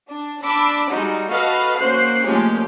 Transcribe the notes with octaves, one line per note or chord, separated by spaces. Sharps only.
D4
D4 B5 D6 E6
G3 G#3 D#4 F#4
F#4 A4 B4 D#5 F5
A#3 C#4 F#4 C5 F#6 C7
A#2 F3 G#3 A3 C#4 G4